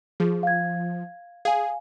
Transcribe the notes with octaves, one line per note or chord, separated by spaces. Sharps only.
F3 G#4
F5 G#6
G#4 F5 G#5